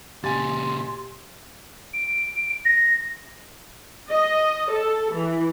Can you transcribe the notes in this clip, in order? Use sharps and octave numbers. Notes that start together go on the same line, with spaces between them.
A#2 C#3 G4 D#5 G#5 C6 A6
D7
A#6
D#5
A4
E3